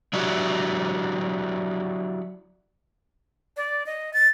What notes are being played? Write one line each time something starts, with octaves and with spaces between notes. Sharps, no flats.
F#3 D4 E4 F#4 G4
D5
D#5
A6